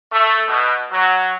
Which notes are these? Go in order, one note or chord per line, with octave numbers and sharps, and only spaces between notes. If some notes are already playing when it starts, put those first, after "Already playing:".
A3
B2
F#3